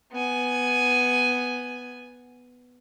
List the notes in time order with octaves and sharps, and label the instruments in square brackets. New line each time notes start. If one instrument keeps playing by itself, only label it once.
[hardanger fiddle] B3 G#5